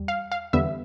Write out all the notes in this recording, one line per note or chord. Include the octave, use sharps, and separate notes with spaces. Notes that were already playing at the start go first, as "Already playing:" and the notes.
Already playing: E2 G3
F5
F5
E2 D3 G3 B3 E5